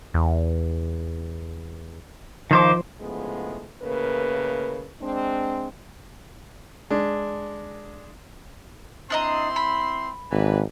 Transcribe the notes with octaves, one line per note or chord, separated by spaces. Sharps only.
E2
D#3 F3 C5 D6
D2 A2 C#3 F3 G#3 B3
A2 C#3 A#3 A#4 B4
G#3 C4 D4
G#3 D4
C4 D4 E4 D#5 A#5 C6
B5
G#1 E3 D4 B4